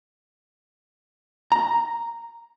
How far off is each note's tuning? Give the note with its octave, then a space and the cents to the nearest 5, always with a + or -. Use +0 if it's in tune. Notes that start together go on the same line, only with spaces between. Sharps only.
A#5 -5